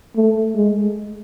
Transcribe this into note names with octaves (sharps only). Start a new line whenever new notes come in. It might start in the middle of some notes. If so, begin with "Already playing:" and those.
A3
G#3